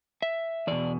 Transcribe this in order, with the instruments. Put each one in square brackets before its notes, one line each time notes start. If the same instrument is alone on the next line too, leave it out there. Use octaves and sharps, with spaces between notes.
[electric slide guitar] E5
E2 B2 D5